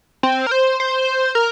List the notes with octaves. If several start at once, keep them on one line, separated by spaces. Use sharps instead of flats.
C4
A#4
C5
C5
A#4